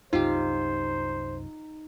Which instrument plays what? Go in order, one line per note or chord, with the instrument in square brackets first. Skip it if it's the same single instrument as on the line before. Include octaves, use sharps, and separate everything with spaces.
[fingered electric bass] C2 F#2 [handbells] D#4 [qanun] F4 G4 [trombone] C5